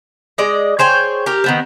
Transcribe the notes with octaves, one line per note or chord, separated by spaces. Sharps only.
G#3 D5 D#5
G#4 C5 C#5 G5
G4 A#4
D#3 B3 C4